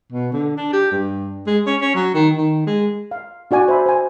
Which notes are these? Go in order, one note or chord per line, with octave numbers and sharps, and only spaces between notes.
B2
D3
D4
G4
G2
G#3
C#4
C#4
F#3
D#3
D#3
G#3
F5
D4 F#4 D5 G#5
C5 E5 B5
C5 G#5